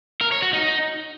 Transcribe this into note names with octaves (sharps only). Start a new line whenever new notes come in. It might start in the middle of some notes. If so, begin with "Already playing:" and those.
A#4
C#5
F#4
D#4